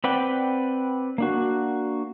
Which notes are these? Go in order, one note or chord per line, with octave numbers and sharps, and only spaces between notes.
C4 B4 D5 F#5 G5
A#3 D4 F#4